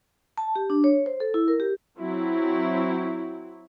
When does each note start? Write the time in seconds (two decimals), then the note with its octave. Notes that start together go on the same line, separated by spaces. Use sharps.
0.38 A5
0.56 G4
0.70 D4
0.84 C#5
1.06 C5
1.20 A4
1.34 E4
1.48 A#4
1.60 G4
1.99 F#3 C4 E4